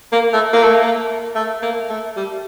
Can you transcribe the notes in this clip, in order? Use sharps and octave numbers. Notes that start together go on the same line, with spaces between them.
A#3
A3
A#3
A3
A#3
A3
A#3
A3
G3